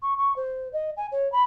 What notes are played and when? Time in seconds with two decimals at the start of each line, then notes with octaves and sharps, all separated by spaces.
0.02 C#6
0.18 C#6
0.36 C5
0.73 D#5
0.97 G#5
1.12 C#5
1.32 B5